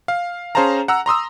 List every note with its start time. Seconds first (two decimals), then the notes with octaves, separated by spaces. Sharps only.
0.08 F5
0.55 C#4 G#4 C5 F5 A5 A#5
0.88 F#5 A#5 E6
1.06 A#5 C6 D#6 E6